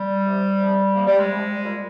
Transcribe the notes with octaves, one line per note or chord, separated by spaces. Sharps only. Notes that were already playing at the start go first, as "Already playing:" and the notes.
Already playing: G3
C3 F3
C3 F3
C3 F3 A#3
G3
G#3
C3 F3
A#2 G3